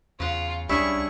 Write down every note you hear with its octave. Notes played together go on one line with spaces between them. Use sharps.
E2 C#3 F4 F#5
C#2 G3 C#4 D4 E4 G#4 C#6